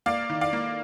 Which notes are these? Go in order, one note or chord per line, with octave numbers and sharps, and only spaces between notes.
A#3 D5 F5
D#3
D5 F5
A#3